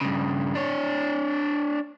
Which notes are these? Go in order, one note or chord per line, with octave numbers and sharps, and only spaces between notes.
G2 C#3
D4 C#5